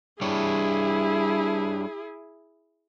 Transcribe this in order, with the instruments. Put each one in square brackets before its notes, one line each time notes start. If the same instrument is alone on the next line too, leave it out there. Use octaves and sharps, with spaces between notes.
[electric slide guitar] G3 D4 C#5 [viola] E4 G#4